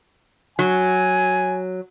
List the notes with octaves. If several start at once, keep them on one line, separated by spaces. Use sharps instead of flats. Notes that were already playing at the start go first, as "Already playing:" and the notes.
F#3 G#5